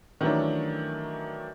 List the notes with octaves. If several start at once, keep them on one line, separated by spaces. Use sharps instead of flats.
D#3 E3 F#3 A3 C#4 D4